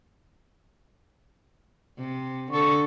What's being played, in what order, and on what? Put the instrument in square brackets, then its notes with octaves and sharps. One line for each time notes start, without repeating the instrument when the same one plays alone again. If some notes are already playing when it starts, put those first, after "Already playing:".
[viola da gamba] C3
[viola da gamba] D3 A4 [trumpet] C#6